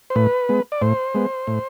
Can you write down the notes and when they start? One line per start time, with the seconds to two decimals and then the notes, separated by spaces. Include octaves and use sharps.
0.10 C5
0.15 A2 B4
0.49 G#3 B3
0.72 D5
0.82 A2 C5
1.15 G#3 B3
1.47 A2